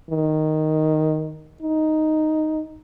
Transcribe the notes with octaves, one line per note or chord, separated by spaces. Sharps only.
D#3
D#4